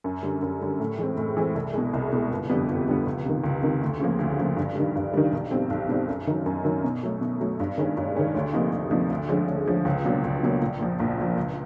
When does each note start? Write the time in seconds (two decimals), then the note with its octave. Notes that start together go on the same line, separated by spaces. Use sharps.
0.04 F#2
0.23 D3 G3
0.42 F#2
0.62 D3 G3
0.80 A2
0.98 E3 G#3 C4
1.17 A2
1.37 E3 G#3 C4
1.55 C2
1.74 B2 G#3
1.93 C2
2.13 B2 G#3
2.31 G1
2.50 F2 D3 G3 B3
2.68 G1
2.88 F2 D3 G3 B3
3.07 C#2
3.25 C3 D#3
3.44 C#2
3.62 C3 D#3
3.81 D2
4.00 C#3 F3 A#3
4.19 D2
4.39 C#3 F3 A#3
4.57 G2
4.76 D#3 G3
4.95 G2
5.13 D#3 G3
5.32 B1
5.51 B2 G3 C4
5.70 B1
5.89 B2 G3 C4
6.08 F#2
6.27 D#3 F#3
6.46 F#2
6.65 D#3 F#3
6.84 B2
7.03 F#3 A3
7.21 B2
7.41 F#3 A3
7.60 G2
7.78 D#3 G#3 C#4
7.97 G2
8.16 D#3 G#3 C#4
8.34 D2
8.53 C3 F3 A#3 D#4
8.72 D2
8.91 C3 F3 A#3 D#4
9.10 D2
9.29 D3 F3 G#3 C#4
9.48 D2
9.67 D3 F3 G#3 C#4
9.85 C#2
10.05 B2 F#3 A#3 D4
10.24 C#2
10.43 B2 F#3 A#3 D4
10.61 A#1
10.79 A#2 F3
11.00 A#1
11.18 A#2 F3
11.36 C#2